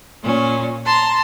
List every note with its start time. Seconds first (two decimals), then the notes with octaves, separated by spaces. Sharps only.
0.23 A#2 C#4
0.85 A5 A#5 C6